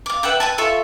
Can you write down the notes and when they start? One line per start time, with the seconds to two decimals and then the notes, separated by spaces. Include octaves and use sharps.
0.06 F5 D6
0.23 B4 E5 F#5 G5
0.40 B4 G#5 A5
0.58 F4 A4 E5 C#6